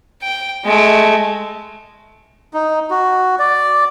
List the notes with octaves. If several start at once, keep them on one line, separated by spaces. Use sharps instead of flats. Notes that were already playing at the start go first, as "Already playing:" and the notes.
G5
G#3 A3
D#4
F#4
D5